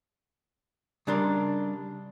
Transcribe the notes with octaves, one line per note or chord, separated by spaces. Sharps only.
C#3 G3 D4 A#4 D5 C6